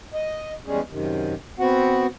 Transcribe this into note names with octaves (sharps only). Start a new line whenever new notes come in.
D#5
E2 G3 G#3 C#4 G#4
F#2 C3 D#3
B3 C4 F#4 F#5